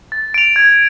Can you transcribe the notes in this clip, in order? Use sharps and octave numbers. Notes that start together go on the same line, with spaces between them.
A6
D7 F7
G#6